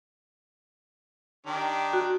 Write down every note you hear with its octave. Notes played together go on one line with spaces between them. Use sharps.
D#3 D4 G4
F#4